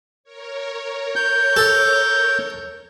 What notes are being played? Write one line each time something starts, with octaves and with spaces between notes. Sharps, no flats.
A#4 C#5
G6
A4